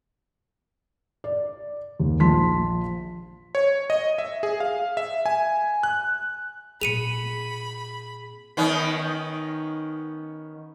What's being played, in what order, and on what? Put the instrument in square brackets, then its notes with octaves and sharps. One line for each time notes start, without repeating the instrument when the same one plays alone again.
[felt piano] D5
D#2
A#1 F4 A5 C6 B6
[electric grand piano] C#5
D#5
E5
G#4
F5
E5
G#5
F#6
[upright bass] A#2 C4 [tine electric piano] G#4 [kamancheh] B5 [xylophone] C#7 D#7 F7
[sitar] D#3 B3 C#4